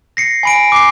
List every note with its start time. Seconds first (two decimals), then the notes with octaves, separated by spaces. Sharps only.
0.17 A#6 C7 C#7
0.43 G#5 B5 D7
0.72 D6 C7